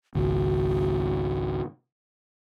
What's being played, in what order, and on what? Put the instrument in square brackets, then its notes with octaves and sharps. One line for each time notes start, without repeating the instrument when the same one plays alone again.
[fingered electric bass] G#1 C#2 [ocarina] F#4